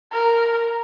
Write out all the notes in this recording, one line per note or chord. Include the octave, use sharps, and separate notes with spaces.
A#4